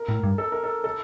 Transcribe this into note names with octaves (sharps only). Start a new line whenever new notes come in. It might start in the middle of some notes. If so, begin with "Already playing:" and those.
Already playing: A#4
A2
G2
A4
A#4
A4
A4